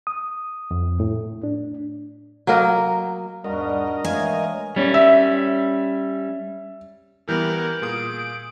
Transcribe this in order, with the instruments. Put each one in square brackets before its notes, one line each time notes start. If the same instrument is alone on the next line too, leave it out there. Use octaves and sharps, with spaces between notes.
[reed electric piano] D#6
F2
A2
D4
[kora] F#3 A#3 A#4 D#5
[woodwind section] E2 G#2 G3 [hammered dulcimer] D4 F#4 [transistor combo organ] A#4 D#5
[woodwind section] E3 G#3 A3 [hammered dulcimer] C#5 F5 [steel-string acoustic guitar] G#5
[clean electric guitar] G3 C#4
[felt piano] E5
[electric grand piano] E3 G3 B3 [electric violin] A#4 [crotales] G6 F#7
[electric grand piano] A#2 G#4 D#6 [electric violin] D7